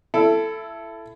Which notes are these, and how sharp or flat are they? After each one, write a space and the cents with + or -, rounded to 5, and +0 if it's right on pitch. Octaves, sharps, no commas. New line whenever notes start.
E4 +25 A4 +0